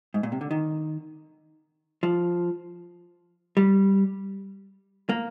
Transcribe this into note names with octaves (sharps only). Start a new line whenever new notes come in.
G#2
A#2
C3
D3
D#3
F3
G3
A#3